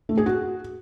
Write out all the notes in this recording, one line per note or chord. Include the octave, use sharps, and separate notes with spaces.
A3
G#4
F#4